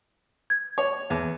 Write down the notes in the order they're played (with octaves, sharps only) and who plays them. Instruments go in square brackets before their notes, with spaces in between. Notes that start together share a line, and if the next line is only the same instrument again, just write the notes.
[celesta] G#6
[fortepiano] C#5
E2